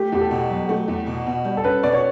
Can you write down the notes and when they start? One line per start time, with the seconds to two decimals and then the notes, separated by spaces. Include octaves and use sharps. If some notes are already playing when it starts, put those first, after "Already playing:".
Already playing: A3 G4
0.12 E2 G4
0.21 A4
0.31 B2
0.49 F#3 A4
0.69 A3
0.88 E2
1.06 B2
1.26 B2
1.45 G3
1.57 A4
1.63 C#4 B4
1.83 B2 D5
1.93 C#5